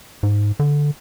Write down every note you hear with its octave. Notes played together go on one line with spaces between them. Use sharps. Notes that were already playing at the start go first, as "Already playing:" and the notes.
G#2
D3